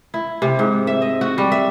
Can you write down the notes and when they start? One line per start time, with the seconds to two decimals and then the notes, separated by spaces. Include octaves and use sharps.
0.14 E4
0.42 C3
0.59 G#2
0.87 E5
1.02 D#5
1.21 F#4
1.38 G3
1.52 E5